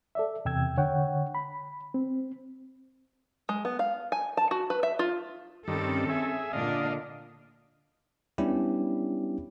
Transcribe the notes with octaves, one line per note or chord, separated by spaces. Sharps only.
A4 D5 E5
E2 C3 G5 E6 G#6
D3 C#5 F#5 G5
B5
C4
G#3
B3
F5
G#5
A5
F#4
B4
E5
F4
G2 D#3 C4 C#4 A4
G#4 E5
A#2 D3 D4 D#5 F5
G3 B3 C#4 D4 E4 G4